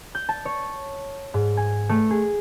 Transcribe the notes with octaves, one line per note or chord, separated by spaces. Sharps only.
G6
A5
C#5
G#2
G#5
A3
G#4